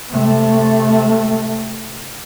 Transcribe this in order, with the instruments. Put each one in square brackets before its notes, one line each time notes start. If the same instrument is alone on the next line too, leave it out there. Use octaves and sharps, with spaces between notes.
[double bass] C3 A3